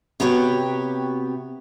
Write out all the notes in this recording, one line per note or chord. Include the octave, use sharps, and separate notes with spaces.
C3 B3 F#4 G4 C#5